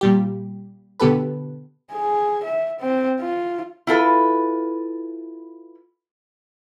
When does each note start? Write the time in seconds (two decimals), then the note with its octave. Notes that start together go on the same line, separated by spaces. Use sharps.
0.01 A#2 G3 G4
1.00 B2 D3 B3 G4 A4 B4
1.93 G#4
2.44 E5
2.80 C4
3.21 F4
3.87 E4 F4 A4 B4